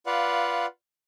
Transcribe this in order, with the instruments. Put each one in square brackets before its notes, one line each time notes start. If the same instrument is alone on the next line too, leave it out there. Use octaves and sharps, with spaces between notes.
[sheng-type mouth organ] F4 B4 D5 F5 F#5